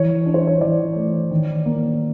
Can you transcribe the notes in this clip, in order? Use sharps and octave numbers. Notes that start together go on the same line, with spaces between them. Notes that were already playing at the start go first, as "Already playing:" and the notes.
Already playing: E3 C#5
D4
C5
C#5
E3 D5
A3
D#3
A#3